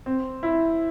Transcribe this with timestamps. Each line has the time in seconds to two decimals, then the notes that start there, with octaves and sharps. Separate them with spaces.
0.06 C4
0.43 E4